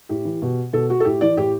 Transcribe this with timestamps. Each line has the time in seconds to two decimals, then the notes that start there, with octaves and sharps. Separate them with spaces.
0.09 A2 G4
0.25 E3
0.42 B2
0.73 B2 A4
0.90 F#4
1.00 A4
1.05 A2 G4
1.21 E3 D5
1.37 A2 G4